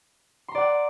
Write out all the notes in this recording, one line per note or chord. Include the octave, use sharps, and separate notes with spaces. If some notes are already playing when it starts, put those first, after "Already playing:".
D5 F#5 A#5 C6